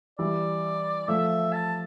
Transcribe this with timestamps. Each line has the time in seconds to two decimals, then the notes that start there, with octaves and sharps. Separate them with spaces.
0.19 E3 G3 D5
1.08 F3 A3 E5
1.53 A5